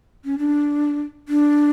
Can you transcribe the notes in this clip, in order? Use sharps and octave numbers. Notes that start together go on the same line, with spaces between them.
C#4
D4
D4